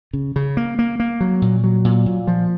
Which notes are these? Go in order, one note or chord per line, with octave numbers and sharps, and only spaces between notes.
C#3
C#3
A#3
A#3
A#3
F#3
A#2
F#3
A#2
A#2
F3